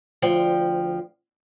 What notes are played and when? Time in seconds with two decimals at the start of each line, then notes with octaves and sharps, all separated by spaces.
0.22 D2 F3 G5